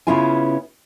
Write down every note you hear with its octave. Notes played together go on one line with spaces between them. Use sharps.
C#3 B3 C#4 E4 F4 G#5